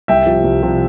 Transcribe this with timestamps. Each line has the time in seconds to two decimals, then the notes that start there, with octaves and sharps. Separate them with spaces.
0.08 C2 E5 G5
0.26 C3 F3
0.44 C2
0.63 C3 F3